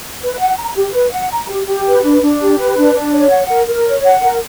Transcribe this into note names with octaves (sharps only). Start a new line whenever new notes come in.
B4
F#5
A#5
G4
B4
F#5
A#5
G4
G4
B4
D4
D4
G4
B4
D4
D4
C#5
F#5
A#4
A#4
C#5
F#5
A#4